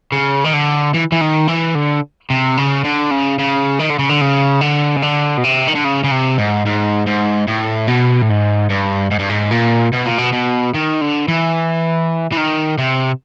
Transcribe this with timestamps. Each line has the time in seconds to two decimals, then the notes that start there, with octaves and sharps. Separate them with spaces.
0.12 C#3
0.44 D#3
0.53 D3
0.94 E3
1.12 E3
1.21 D#3
1.48 E3
1.75 D3
2.30 C3
2.58 C#3
2.85 D3
3.11 C#3
3.39 C#3
3.79 D#3
3.90 D3
3.99 C#3
4.09 D3
4.21 C#3
4.61 D3
4.96 C#3
5.02 D3
5.37 B2
5.44 C3
5.67 D#3
5.75 D3
5.84 C#3
6.04 C#3
6.11 C3
6.38 G#2
6.66 G#2
7.07 G#2
7.48 A2
7.88 B2
8.22 A2
8.29 G#2
8.70 G2
9.11 G#2
9.19 G2
9.30 G#2
9.51 A#2
9.93 B2
10.05 A#2
10.18 B2
10.32 B2
10.74 D#3
11.01 D3
11.28 E3
12.32 E3
12.37 D#3
12.78 C3